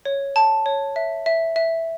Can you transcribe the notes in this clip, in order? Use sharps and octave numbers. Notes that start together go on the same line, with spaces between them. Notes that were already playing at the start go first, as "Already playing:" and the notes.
C#5
A5
C#5
E5
E5
E5